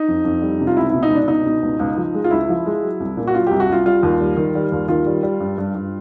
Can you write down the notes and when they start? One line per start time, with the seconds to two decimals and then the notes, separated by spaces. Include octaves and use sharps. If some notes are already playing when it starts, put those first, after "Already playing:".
Already playing: D#4
0.08 F2
0.25 F2
0.42 G3
0.60 C3
0.67 F4
0.77 C#2 E4
0.90 B2 E4
1.03 D#4
1.11 C#2 D4
1.28 B2 D#4
1.46 B2
1.63 C#2
1.79 C#2
1.97 F3
2.14 G#3
2.24 F4
2.31 C#2 E4
2.49 F3
2.66 G#3
2.82 F#3
3.00 C2
3.17 A#2
3.27 F#4
3.34 F#3 F4
3.47 C2 G4
3.60 F#4
3.69 C2 F4
3.86 G3 F4
4.03 D#2
4.20 G3
4.37 D#3
4.55 G3
4.72 D#2
4.88 D#3 F4
5.06 G3
5.23 G3
5.40 G2
5.58 G2
5.75 G2